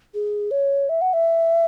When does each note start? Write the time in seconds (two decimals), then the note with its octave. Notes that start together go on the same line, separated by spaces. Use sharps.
0.14 G#4
0.51 C#5
0.89 E5
1.01 F#5
1.13 E5